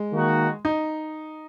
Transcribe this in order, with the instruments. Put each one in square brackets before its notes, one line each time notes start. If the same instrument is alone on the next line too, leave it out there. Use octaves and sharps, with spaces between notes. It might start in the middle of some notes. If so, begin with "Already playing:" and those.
Already playing: [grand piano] G#3
[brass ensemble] D#3 A#3 D#4 F#4
[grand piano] D#4